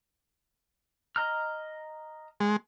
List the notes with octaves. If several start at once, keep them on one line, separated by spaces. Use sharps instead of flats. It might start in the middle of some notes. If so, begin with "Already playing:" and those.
D#5 A#5 F6
G#3